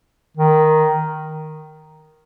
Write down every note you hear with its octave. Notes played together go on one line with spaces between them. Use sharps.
D#3